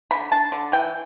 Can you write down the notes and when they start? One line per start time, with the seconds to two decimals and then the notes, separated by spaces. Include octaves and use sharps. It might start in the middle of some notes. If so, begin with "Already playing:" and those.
0.11 D3 B5
0.32 D4 A5
0.52 D3
0.72 E3 G5